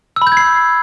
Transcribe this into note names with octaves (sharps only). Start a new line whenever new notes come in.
E6
B5
G6
G#6
C7